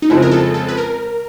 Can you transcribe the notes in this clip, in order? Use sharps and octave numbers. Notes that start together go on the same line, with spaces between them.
D#4
F2 C#3 F3 G#3 C4 E4
A#4
A4
A4
B4
A#4